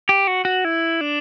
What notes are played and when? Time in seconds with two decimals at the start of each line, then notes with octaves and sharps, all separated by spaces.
0.09 G4
0.27 F#4
0.45 F#4
0.65 E4
1.01 D4